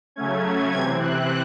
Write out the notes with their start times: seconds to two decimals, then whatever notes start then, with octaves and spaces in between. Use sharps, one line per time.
0.16 C#3 F#3 A3 C#4 G#6
0.72 C3 E3 C4 G#6
1.00 F#6